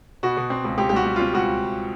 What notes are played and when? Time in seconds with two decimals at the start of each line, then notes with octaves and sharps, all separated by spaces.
0.23 B2 F#4
0.37 B2
0.50 C4
0.65 C#2
0.78 C#2 G4
0.89 G4
0.93 G3 F#4
1.05 G3
1.16 C4 F4
1.33 C#2 F#4